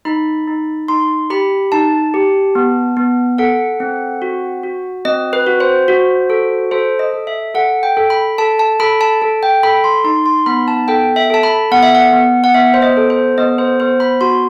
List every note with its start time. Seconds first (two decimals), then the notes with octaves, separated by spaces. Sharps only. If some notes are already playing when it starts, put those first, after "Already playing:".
0.05 D#4 B5
0.47 D#4
0.88 D#4 C6
1.30 G4 B5
1.72 D#4 A5
2.14 G4
2.55 B3
2.97 B3
3.38 A4 F#5
3.80 C4
4.22 F#4
4.63 F#4
5.05 C4 D#5
5.33 B4
5.46 F#4
5.60 C5
5.88 F#4
6.30 A4
6.71 A4 C5
6.99 D#5
7.13 A4
7.27 E5
7.55 A4 F#5
7.83 G5
7.97 A4
8.10 B5
8.38 A4 A5
8.59 A5
8.80 A4 B5
9.01 A5
9.22 A4
9.43 G5
9.63 A4 B5
9.84 C6
10.04 D#4 C6
10.26 C6
10.46 B3 B5
10.68 A5
10.88 A4 G5
11.16 E5
11.30 A4 A5
11.43 B5
11.71 B3 F#5
11.83 E5
11.95 F#5
12.13 B3
12.44 F#5
12.54 B3 E5
12.74 C5
12.82 D#5
12.97 A4
13.10 C5
13.38 B3 D#5
13.58 C5
13.80 B3 C5
14.00 B5
14.21 F#4 C6